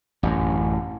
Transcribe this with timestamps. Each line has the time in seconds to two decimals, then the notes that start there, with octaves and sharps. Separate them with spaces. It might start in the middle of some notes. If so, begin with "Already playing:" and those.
0.23 A1 F#2